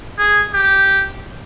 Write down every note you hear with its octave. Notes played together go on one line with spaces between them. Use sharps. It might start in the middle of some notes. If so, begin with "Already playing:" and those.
G#4
G4